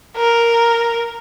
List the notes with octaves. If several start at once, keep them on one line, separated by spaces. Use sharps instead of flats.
A#4